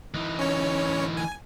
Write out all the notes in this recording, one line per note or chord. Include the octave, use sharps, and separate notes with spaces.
E3 D#4
C#4 C#5
G#5